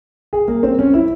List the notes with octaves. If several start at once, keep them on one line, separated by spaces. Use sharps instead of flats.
G#4
A#3
C4
C#4
E4